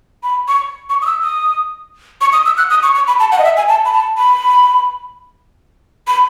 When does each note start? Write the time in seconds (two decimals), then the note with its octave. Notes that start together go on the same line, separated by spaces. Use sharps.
0.23 B5
0.48 C#6
0.90 C#6
1.02 D#6
1.06 E6
1.23 D#6
2.21 C#6
2.33 D#6
2.45 E6
2.58 F#6
2.70 D#6
2.83 C#6
2.95 C#6
3.08 B5
3.20 A5
3.32 F#5
3.38 D#5
3.44 E5
3.57 G#5
3.68 A5
3.85 B5
3.93 A5
4.18 B5
6.08 B5